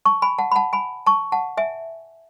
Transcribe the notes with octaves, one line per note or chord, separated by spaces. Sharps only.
A5 C#6
G#5 B5
F#5 A5
B5
F#5 A5
G#5 B5
A5 C#6
F#5 A5
E5 G#5